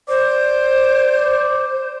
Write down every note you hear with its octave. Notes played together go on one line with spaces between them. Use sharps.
C5 D5